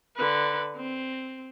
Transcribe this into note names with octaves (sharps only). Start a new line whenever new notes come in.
D3 B4
C4